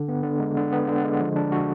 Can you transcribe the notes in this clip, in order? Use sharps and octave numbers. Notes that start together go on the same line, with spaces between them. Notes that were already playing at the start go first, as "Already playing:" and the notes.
Already playing: D3
B3
D3
G#3
D3
B3
D3
G#3
F3
D4
F#4